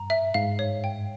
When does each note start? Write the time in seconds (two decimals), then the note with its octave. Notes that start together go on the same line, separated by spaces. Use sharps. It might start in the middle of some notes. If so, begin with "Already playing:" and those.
Already playing: G2 A#5
0.10 E5
0.34 G#2 F5
0.59 C#5
0.84 G5